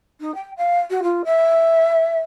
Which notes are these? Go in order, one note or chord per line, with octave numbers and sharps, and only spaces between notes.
D#4
G5
F5
F#4
F4
E5